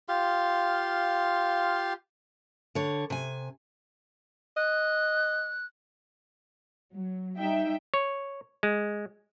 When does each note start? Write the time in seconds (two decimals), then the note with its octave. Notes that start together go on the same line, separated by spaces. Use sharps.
0.08 F4 G4 F5 C6
2.75 D3 C#5
3.10 C3 G#5
4.57 D#5 F#6
6.93 F#3
7.37 G3 D#4 E5 G5
7.94 C#5
8.63 G#3